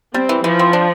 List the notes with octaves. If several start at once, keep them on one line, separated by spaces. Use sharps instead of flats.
G3 C4
E3
E3 F3
C4
D4